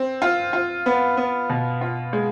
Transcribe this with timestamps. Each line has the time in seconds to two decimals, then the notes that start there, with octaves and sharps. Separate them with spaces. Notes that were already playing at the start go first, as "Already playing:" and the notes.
Already playing: C4
0.22 F4
0.53 F4
0.86 B3
1.17 B3
1.50 B2
1.81 F4
2.13 G#3